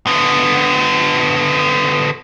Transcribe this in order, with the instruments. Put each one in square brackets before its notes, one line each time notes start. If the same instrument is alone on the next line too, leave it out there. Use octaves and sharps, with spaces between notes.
[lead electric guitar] D3 B3